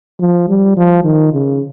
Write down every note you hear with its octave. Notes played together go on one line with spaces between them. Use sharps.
F3
G3
F3
D#3
C#3